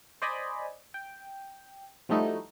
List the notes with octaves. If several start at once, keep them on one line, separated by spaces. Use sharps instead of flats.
C5 D5 D#5 G#5 B5
G5
F3 G3 A3 D#4 E4 F#4